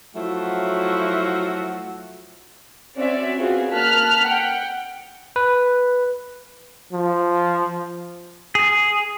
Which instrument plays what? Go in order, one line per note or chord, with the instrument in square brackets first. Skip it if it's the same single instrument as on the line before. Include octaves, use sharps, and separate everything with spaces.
[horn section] F3 F#3 A3 E4 F#4
[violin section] C4 C#4 F#4 D5 E5
B3 C4 F4 F#4 G#4
A#3 A5 F6 F#6 B6
F#5 G5
[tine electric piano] B4
[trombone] F3
[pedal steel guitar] G#4